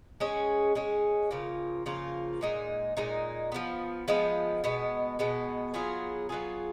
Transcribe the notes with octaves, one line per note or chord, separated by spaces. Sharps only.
G#3 C#4 G#4
G#3 C#4 G#4
C#3 F3 A#3 F4
C#3 F3 A#3 F4
A#2 G#3 D#4
A#2 G#3 D#4
F3 G#3 B3
F3 G#3 B3
B2 G#3 B3
B2 G#3 B3
F#3 B3 F4 G#4
F#3 B3 F4 G#4